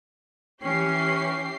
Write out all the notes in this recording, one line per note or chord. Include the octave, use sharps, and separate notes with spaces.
E3 C#4 G4 C7